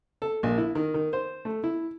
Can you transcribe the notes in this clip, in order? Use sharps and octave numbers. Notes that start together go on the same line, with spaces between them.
A4
A#1
E4
D#3
D#3
C5
A3
E4